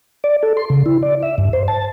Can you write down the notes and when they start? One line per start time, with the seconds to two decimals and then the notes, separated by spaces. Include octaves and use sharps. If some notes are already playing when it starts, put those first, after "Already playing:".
0.24 D5
0.43 A4
0.57 C6
0.70 C#3
0.86 E4
1.03 D5
1.23 E5
1.38 G2
1.53 C5
1.68 A5